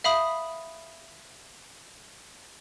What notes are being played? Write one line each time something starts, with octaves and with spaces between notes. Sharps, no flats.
E5 F5 B5 D#6